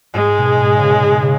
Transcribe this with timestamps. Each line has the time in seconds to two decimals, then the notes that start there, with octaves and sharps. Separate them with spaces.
0.14 G#2 G#3
0.38 B2
0.60 G#2
0.77 C#3
0.83 B2
1.06 B2
1.22 C#3